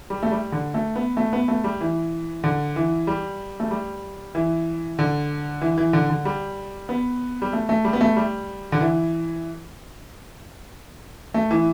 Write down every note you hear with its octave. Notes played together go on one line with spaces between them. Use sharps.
G3
A3
G3
D3
A3
B3
A3
B3
A3
G3
E3
D3
E3
G3
A3
G3
E3
D3
E3
E3
D3
D3
G3
B3
G3
A3
A3
G3
B3
A3
G3
D3
E3
A3
E3